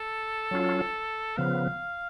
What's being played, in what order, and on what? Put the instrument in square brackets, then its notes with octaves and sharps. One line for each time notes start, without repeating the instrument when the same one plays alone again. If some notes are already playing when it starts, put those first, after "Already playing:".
Already playing: [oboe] A4
[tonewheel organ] F#3 C#4 F4
[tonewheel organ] C#3 F3 B3 [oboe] F5